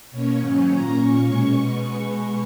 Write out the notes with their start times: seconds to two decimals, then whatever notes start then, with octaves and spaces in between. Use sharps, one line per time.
0.11 B2 A#3 C#4 C#5
0.40 G#2 D#3 F#3 C#4
0.68 A#2 A#3 C#4 A#5
0.96 A#2 A#3 C#4 C#6
1.23 B2 G#3 C#4
1.52 B2 G#3 B3 C#6